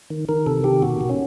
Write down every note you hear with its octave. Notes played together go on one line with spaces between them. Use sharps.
D#3
D#3 A#4
C3 A4
D#3 G4
B2 F#4
B2
C#4